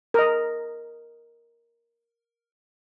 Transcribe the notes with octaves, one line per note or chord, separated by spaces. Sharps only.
A#4 D#5